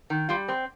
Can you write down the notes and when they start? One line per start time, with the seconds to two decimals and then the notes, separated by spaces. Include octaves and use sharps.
0.10 D#3
0.29 G3 F4
0.48 C4